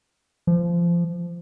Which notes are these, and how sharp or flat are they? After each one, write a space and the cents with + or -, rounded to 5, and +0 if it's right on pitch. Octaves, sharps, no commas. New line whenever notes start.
F3 -20